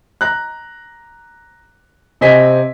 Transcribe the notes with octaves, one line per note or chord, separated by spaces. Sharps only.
A#5 F#6
C3 C4 D#5 G#5 B6